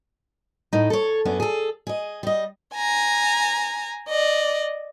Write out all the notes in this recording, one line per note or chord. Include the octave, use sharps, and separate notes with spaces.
A2 D#4
A4 C#5
F#2 B3 C#4 D4
G#4 A4
G#4 D#5
G3 D#5
G#5 A#5
D5 D#5